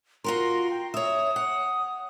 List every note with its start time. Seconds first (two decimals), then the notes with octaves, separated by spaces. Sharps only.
0.24 F4 F#4 A#4 C6
0.70 G5
0.94 C#5 E5 D#6
1.36 F#5